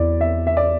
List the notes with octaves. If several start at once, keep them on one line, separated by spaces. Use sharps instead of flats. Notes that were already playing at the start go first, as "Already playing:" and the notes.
Already playing: E2 E4 D5
E5
E5
D5